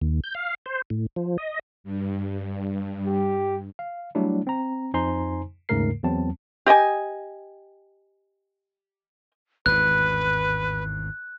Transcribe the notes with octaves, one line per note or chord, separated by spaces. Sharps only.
D#2
G6
F5
C5
A2
F3
D#5
G2
G4
F5
F#3 G3 A3 D4 E4
C4 A#5
F2 D#4 C5 G#5 A#5 C6
D#2 G#2 C#3 A3 A#4 C7
E2 F#3 C4 A5
G4 D#5 G5 G#5
G#1 E2 A2 B4 F#6